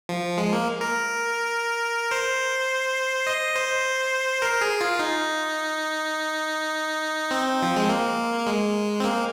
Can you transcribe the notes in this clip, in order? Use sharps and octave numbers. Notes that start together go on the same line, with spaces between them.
F3
G#3
A#3
A#4
C5
D#5
C5
A#4
G#4
F4
D#4
C4
F3
G#3
A#3
G#3
C4
A#3